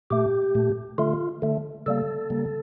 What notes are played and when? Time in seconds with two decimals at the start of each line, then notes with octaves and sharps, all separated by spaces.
0.10 A#2 A3 G4
0.55 A#2 A3
0.98 D3 A3 F4
1.42 D3 A3
1.86 C#3 G3 A#3 A4
2.30 C#3 G3 A#3